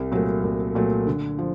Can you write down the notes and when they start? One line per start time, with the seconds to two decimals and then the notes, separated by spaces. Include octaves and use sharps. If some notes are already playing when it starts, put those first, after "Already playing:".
Already playing: C2
0.12 A#2 F#3 A3
0.43 C2
0.75 A#2 F#3 A3
1.07 D3
1.39 F3